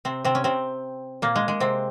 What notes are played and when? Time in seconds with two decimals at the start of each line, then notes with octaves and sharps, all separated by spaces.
0.05 C3 C4
0.24 C3 C4
0.35 C#4
0.44 C3 C4
1.22 A#2 A#3
1.36 G#3
1.48 G#3
1.60 C3 C4